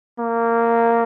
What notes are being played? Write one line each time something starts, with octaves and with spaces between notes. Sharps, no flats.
A#3